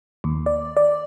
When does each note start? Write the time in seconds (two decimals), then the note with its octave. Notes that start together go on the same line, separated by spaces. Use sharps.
0.24 D#2
0.46 D5
0.77 D5